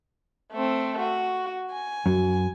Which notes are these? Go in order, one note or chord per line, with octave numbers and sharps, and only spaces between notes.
A3 C4
F#4
G#5
F#2